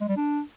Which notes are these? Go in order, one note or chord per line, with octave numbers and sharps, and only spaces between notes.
G#3
G3
D4